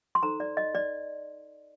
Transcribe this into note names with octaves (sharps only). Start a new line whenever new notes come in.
C6
D#4 A4 C5 A#5
D5
D#5
D5